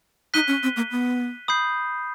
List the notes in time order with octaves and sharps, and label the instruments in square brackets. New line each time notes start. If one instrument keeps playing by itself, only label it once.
[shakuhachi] D#4 [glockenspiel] F#6 B6 D#7 G7
[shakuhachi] C#4
C4
A#3
B3
[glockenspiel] B5 D#6 G6 C7